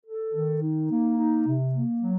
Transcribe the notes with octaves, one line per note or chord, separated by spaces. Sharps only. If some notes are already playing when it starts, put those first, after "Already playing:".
A4
D#3
D#4
A#3
D#4
C3
A#3
F#3